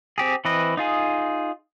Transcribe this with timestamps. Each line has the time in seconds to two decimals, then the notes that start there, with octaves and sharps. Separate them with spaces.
0.18 C4 G4 G#4
0.45 E3 C4 B4 D#5
0.77 D#4 F4 G#4